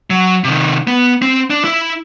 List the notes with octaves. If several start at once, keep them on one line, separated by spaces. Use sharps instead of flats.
F#3
C3 D#3
B3
C4
D4
E4